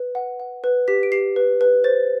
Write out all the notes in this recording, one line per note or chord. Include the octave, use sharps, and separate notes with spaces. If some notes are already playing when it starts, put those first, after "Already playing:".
Already playing: B4
F#5
F#5
B4
G4 B6
D7
G4 C7
B4
B4
C5 A6